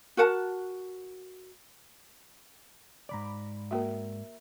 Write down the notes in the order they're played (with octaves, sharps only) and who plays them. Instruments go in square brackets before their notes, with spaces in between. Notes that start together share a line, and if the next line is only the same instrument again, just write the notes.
[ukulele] F#4 A#4 F#5 A5
[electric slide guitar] G#2 C#3 D5 [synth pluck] A#5 B5 D6
[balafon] A#3 F#4 [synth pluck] A#4 E5